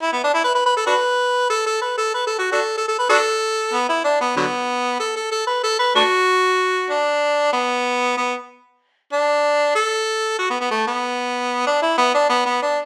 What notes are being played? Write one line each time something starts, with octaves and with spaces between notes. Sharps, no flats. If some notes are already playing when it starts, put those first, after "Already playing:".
E4
B3
D4
E4
B4
B4
B4
A4
D4 F#4 B4
A4
A4
B4
A4
B4
A4
F#4
D4 F#4 A4
A4
A4
B4
D4 F#4 A4
B3
E4
D4
B3
D3 F#3 B3
A4
A4
A4
B4
A4
B4
A3 D4 F#4
D4
B3
B3
D4
A4
F#4
B3
B3
A3
B3
D4
E4
B3
D4
B3
B3
D4